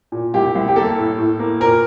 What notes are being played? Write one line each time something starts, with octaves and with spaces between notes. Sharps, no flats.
A#2
C2 G4
C2
G4
A#3 A4
A2
A2
A#3
A#2 A#4